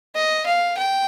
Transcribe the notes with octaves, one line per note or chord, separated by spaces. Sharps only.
D#5
F5
G5